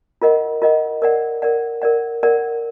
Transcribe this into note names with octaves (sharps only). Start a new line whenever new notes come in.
F4 A#4 D#5 F#5
F4 A#4 D#5 F#5
A#4 D5 F#5
A#4 D5 F#5
A#4 D5 F#5
A#4 D5 F#5